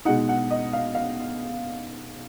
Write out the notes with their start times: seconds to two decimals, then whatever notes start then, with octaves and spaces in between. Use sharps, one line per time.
0.05 B2 G#3 D#4 F#5
0.29 F#5
0.51 D#5
0.73 F5
0.95 F5